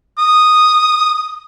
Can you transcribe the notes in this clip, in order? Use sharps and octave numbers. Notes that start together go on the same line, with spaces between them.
D#6